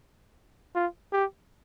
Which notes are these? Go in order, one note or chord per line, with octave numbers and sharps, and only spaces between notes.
F4
G4